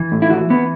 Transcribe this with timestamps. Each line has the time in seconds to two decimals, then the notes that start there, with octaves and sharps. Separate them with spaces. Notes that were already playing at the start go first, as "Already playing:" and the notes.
Already playing: E3
0.12 A2
0.22 E4
0.30 E3 F#4
0.50 E3 B3